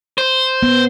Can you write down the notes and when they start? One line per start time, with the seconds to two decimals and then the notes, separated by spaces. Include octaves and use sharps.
0.18 C5
0.63 B3